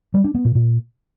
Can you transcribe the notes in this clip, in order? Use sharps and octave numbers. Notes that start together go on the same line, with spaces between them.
G3
D4
B3
A#2
A#2